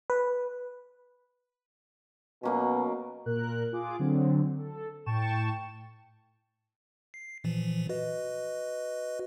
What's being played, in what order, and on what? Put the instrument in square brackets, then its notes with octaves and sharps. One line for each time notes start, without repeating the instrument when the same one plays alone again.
[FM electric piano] B4
[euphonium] B2 [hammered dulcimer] F#3 A#3 C#4
[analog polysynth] A#2 A#4 F#6
F4 G#4 D6
D3 F#3 C4
A4
A2 G5 A5 C#6 E7
[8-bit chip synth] C7
A#2 E3 F3
F#4 B4 D#5